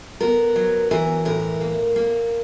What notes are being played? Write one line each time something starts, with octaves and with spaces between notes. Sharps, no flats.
B3 A#4
F#3
E3 A#4
A2 A#4
A#3
A#3